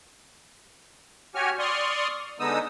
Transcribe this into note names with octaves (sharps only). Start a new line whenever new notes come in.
F#4 G4 C#5 G#5 F6
D5 C6 C#6 D#6 F6
D3 G#3 B3 D#4 D#6 E6